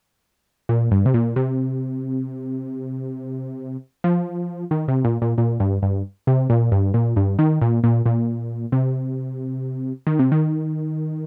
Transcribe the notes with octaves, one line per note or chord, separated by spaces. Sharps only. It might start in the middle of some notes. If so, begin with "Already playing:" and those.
A#2
G2
C3
A#2
C3
F3
D#3
C3
A#2
A#2
A#2
G2
G2
C3
A#2
G2
A#2
G2
D#3
A#2
A#2
A#2
C3
D#3
C3
D#3